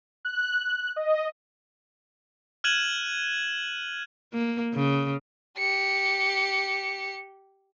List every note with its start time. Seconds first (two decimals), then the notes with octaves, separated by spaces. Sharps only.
0.25 F#6
0.96 D#5
2.64 F6 F#6 G#6 D#7 E7 F#7
4.34 A#3
4.74 C#3
5.57 G4 C#7